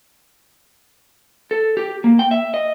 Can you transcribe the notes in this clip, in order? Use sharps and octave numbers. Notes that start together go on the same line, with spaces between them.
A4
G4
A#3
G5
E5
D#5